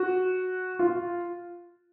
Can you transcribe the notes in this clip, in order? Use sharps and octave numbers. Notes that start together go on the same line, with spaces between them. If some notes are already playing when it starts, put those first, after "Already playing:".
Already playing: F#4
F4